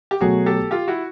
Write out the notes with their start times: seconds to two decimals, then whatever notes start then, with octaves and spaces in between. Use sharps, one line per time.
0.11 G4
0.21 B2 F#3 A3 F#4 G#4
0.46 G4 A4
0.71 F4 G4
0.88 E4 F#4